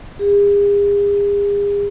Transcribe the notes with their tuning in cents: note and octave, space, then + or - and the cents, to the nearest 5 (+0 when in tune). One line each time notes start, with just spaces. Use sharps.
G#4 -45